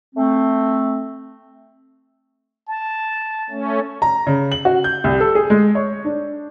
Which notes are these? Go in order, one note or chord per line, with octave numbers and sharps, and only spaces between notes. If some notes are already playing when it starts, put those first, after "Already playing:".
A3 C4
A5
A3 C#4
A#5
C#3
F#7
F#4
G6
C2
A4
G#4
G#3
C#5
D4